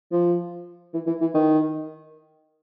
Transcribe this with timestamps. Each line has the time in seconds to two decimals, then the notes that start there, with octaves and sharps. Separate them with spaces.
0.12 F3
0.94 E3
1.07 E3
1.21 E3
1.34 D#3